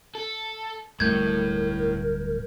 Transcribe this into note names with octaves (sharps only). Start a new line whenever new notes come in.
A4
D1 A2 G3 A3 A#4 G6 G#6